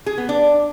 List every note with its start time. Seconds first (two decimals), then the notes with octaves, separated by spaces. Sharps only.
0.06 G#4
0.18 B3
0.29 D4